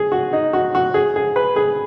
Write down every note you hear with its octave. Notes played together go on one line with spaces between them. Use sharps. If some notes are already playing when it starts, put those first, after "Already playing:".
Already playing: G#4
F#4
D#4
F#4
F#4
G#4
G#4
B4
G#4